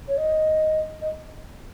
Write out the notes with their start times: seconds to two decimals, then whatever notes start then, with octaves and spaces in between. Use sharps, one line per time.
0.08 C#5
0.17 D#5
1.02 D#5